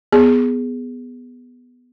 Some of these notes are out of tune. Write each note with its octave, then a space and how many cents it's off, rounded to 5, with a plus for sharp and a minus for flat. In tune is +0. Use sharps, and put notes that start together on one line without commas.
B3 +0 G#4 +0